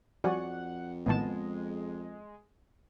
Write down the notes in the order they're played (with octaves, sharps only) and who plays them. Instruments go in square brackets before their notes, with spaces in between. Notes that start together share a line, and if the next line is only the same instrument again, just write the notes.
[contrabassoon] F2 [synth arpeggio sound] F3 G3 [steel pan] F#4 D5 G#5 [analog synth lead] F#5
[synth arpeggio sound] A1 A2 D#3 [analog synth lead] G#3 [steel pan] B3 A5